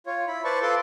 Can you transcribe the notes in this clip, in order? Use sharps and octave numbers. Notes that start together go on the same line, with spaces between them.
F4 C#5
E4 B5
B4 C5 D5 A5 C#6
F4 A4 B4 A5 C6 D6